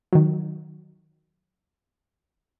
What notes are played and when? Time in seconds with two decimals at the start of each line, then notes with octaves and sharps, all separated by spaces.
0.13 D#3 F#3